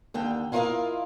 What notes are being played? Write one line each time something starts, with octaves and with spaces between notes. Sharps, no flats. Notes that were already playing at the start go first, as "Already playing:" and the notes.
D#2 D3 G5
E4 F4 A#4 C5 D#5 F5